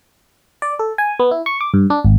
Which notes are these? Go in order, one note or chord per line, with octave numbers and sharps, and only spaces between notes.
D5
A4
G#5
B3
E4
C#6
D6
G2
D4
G#1